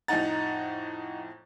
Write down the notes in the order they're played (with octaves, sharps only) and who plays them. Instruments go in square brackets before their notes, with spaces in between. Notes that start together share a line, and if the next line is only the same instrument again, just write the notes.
[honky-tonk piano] F2 A2 A#5 [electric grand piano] D#4 F#5 A6